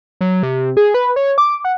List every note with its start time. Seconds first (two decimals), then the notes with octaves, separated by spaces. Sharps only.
0.21 F#3
0.43 C3
0.77 G#4
0.94 B4
1.16 C#5
1.38 D6
1.64 F#5